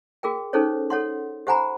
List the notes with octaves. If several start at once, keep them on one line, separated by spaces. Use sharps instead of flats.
F#4 G#4 A#4 G5
C#4 D#4 G#4 A4 C5 C#5
A4 C#5 F#5 C6
G4 C5 F#5 G#5 A#5 B5